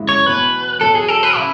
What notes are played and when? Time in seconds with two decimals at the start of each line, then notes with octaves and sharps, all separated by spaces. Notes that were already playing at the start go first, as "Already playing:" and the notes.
Already playing: F#2 C#3 G#3 E4
0.09 C#5
0.26 E2 B2 F#3 B3 B4
0.81 E2 B2 F#3 B3 A4
0.95 G#4
1.08 A4
1.23 B4
1.36 C#3 E4